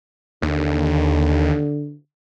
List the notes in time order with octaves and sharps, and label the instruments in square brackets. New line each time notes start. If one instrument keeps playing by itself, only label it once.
[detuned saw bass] D#2 [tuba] D3